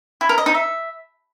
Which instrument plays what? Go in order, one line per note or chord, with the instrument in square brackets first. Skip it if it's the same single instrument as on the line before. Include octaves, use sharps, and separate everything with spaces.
[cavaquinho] E4
A#4
D#5
D#4
E5